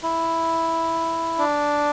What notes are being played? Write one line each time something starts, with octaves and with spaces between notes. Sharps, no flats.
E4
D4